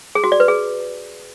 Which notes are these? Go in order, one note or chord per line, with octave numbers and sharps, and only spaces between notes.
G#4
F#4
D5
B4
G#4